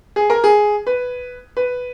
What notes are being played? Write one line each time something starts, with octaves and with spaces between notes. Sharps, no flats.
G#4
A#4
G#4
B4
B4